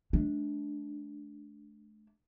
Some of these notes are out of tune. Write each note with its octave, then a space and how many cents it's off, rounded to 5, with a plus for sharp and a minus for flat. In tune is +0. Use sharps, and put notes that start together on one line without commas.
A3 -45 D4 -10